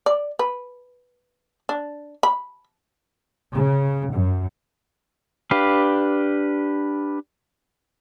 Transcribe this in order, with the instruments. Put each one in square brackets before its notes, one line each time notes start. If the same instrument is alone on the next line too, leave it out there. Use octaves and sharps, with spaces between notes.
[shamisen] D5
B4
D4
B5
[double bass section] C#3
F#2
[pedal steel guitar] D4 G4 B4 F5